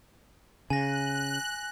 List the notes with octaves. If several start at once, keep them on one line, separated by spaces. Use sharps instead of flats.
C#3 G#5 F#6 A#6